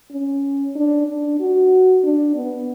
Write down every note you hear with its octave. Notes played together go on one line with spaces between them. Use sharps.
C#4
D4
D4
F#4
D4
B3